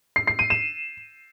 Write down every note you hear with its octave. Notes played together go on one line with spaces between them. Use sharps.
C7
C7
D#7
E7